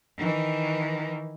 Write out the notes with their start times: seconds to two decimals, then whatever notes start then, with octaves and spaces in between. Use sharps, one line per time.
0.17 D#3 E3